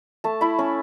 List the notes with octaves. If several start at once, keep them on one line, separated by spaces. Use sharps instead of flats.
A3 A5
E4 B5
C#4 B5